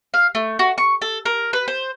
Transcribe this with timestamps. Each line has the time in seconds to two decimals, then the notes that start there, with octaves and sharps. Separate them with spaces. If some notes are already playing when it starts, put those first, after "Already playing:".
0.14 F5
0.35 A3
0.59 F#4
0.78 C#6
1.02 A4
1.25 A#4
1.53 B4
1.68 C5